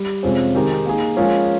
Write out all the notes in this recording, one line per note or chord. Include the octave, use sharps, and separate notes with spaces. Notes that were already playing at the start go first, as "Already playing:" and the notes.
Already playing: G3
F2 C3 F3 G#3 C#4
D#3 G#3 D#4 G4 A#4
A#3 D#4 G#4
F3 G#3 C#4 F4 A#4